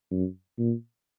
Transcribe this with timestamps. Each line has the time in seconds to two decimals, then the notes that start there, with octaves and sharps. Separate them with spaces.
0.11 F#2
0.58 A#2